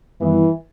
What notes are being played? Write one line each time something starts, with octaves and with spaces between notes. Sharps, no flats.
F#2 D#3 E3 G3 B3 E4